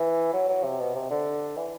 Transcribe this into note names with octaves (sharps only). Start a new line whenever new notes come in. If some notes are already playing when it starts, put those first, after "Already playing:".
Already playing: E3
F#3
F#3
C3
B2
C3
D3
E3